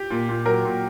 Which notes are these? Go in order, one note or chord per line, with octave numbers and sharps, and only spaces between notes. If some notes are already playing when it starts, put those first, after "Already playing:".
Already playing: G4
A#2
A#2
F#3 A#4
A#2